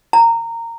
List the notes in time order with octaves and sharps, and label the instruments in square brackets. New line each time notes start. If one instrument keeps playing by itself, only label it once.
[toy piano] A#5